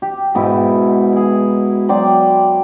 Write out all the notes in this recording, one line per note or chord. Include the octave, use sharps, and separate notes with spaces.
G4
G#2 B2 E4
E4 G#4
F#3 D5 G5 C6